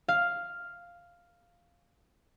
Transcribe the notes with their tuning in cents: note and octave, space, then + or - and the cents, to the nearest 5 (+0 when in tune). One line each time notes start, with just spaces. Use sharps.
F5 +0